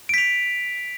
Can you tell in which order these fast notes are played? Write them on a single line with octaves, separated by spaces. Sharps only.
D7 B6 F7